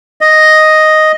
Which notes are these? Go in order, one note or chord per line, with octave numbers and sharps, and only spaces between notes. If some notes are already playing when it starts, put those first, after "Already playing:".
D#5